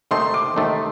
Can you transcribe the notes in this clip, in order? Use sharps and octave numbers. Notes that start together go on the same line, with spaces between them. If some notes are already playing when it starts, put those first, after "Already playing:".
D#2 D#3 A3 C4 D#4 C6
D6
D#2 D#3 A3 C4 D#4